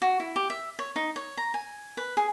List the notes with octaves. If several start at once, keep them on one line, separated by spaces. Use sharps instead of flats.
F#4
E4
G4
E5
C#5
D#4
C#5
A#5
G#5
B4
G#4